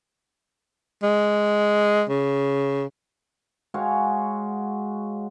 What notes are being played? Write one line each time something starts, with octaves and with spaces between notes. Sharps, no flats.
G#3
C#3
G#3 F#4 C#5 F5